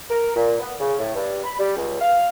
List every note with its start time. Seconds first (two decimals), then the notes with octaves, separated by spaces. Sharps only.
0.10 A#4
0.36 A#2
0.59 B3
0.80 C#3
0.99 A2
1.15 G2
1.44 B5
1.59 G3
1.77 C#2
2.00 F5